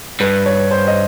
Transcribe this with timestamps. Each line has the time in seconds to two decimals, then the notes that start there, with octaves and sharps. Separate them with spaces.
0.20 G2 B4
0.46 C#5
0.71 C5
0.88 D#5